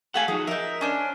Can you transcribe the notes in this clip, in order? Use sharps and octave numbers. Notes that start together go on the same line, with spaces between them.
A3 G4 A4 F5 F#5 G#5
F3 D#4 F#4 G#4
D#4 A#4 E5
C#4 D4 C5